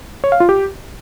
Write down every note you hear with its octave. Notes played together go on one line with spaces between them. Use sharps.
C#5
F5
F4
G4